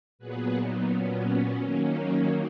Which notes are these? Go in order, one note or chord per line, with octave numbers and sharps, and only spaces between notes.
A#2 F#3 B3 G#4 B4
D#4
C#4
D#3 F#3 A#3